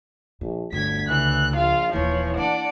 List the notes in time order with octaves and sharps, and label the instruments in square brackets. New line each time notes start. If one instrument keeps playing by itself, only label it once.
[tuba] A#1 [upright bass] A#2
[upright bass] G1 G2 [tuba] D2 [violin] G#6 B6
[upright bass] C#2 [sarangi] E3 [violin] F#6
[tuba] A#1 [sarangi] F4 [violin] F5
[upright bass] D#1 A#3 [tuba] E3 [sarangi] F3 [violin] C#5
[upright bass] A#3 [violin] D4 D5 [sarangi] F#5